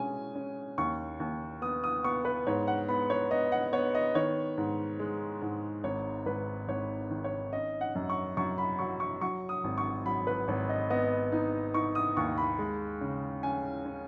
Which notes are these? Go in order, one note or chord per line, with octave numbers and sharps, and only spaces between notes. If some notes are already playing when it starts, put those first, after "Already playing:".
Already playing: B2 G#3 C#4 G#5
C#4
D#2 C#6
D#2
B3 D#6
D#6
B3 C#6
B4
G#2 C#5
F#5
B3 B5
C#5
B3 D#5
F#5
B3 C#5
D#5
D#3 C#5
G#2
G#3
G#2
G#1 C#5
G#1 B4
G#1 C#5
D#3
C#5
C#4 D#5
F#5
F#2
C#6
F#2 C#6
B5
F#3 C#6
C#6
F#3 C#6
D#6
G#1
C#6
F#3 B5
B4
G#1 C#5
D#5
B3 D#5
D#4
D#4 C#6
D#6
D#2 C#6
B5
G#3
C#3
C#4 G#5
C#4